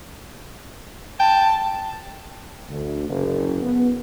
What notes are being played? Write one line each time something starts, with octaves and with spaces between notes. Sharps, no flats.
G5 A5
D2
F#1
B3